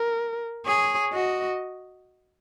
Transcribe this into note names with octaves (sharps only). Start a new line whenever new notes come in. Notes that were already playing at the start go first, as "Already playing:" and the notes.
Already playing: A#4
G#4 C#5
F#4 D#5